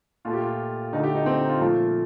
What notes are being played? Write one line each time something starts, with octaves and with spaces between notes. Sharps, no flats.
A#2 A3 F4
G4
F4
D3 A3 D#4
G4
D#4
C4
D#4
F4
A#2 F3 A3